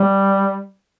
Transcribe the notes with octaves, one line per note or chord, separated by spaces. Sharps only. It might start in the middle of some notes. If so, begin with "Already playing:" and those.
Already playing: G3